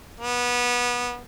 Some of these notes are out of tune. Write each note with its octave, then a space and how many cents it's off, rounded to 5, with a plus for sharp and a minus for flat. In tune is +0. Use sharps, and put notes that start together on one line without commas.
B3 -20